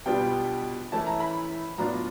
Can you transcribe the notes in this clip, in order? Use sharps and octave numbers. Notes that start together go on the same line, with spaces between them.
B2 G3 B3 D4 F4 G5
E3 A3 C#4 E4 A5
A#5
B5
A2 F#3 B3 D4 F4 A#5